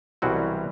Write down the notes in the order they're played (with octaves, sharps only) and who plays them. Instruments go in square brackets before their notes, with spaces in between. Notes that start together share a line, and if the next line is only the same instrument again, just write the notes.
[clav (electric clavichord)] C2 B2 F#3 C4 F#4 [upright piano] E3 G3